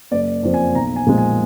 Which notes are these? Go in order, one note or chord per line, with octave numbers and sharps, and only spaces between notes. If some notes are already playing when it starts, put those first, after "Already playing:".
F#1 D5
F2 F3
G#5
B1 A#5
G#5
A#2 F3 G#3
G#5